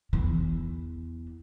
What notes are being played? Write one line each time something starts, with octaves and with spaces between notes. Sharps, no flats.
E2 E3